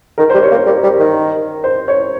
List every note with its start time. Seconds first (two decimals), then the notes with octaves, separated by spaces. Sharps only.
0.18 D#3 A#4
0.30 G3 C5
0.43 C#5
0.51 A#3
0.55 C#5
0.66 G3 A#4
0.83 G3
0.99 D#3
1.64 C5
1.88 C#5